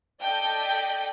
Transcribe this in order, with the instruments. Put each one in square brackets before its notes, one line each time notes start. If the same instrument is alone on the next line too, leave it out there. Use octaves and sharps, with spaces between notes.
[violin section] A4 D5 D#5 G5 G6 B6